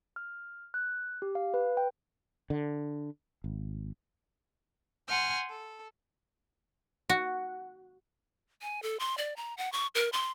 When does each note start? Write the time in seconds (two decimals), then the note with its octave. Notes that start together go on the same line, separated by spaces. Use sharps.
0.16 F6
0.74 F#6
1.22 G4
1.35 F5
1.54 B4
1.77 G5
2.50 D3
3.44 G#1
5.07 F#5 G#5 C6 F6 G6
5.49 A4
7.10 F#4
8.62 G#5
8.83 A4
9.00 C6
9.18 D5
9.36 A#5
9.58 F#5
9.72 C#6
9.95 A#4
10.13 C6